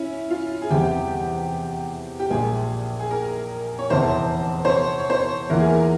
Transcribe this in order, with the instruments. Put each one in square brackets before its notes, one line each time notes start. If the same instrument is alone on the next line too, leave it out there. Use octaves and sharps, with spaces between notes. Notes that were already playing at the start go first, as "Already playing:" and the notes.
Already playing: [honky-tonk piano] C#4 E4
F4
G#4
[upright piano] F1 E2 C3 E3 G3 [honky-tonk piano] G4
[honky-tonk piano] G4
[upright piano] A#1 A#2 G#3 [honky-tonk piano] G#4
[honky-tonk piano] G#4
A#4
C#5
[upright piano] F1 E2 E3 [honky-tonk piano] C5
[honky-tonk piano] C5
C#5
C#5
C5
[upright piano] E2 E3 A#3 F4 [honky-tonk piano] A#4
[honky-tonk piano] G#4
A#4